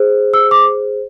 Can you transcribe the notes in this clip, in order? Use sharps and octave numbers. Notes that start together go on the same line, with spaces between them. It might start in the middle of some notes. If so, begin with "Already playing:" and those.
Already playing: G#4 C5
E6
D6